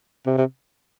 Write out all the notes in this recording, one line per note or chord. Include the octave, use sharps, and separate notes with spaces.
C3
C3